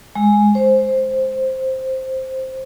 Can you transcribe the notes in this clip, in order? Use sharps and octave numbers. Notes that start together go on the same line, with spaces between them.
G#3
C5